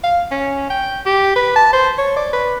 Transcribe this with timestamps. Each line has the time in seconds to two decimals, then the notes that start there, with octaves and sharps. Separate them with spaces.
0.04 F5
0.31 C#4
0.70 G5
1.06 G4
1.36 B4
1.56 A5
1.73 C5
1.98 C#5
2.16 D5
2.33 B4